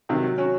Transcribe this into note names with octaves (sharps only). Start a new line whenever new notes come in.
C3 D#3 F#3
F#3
C#4 F#4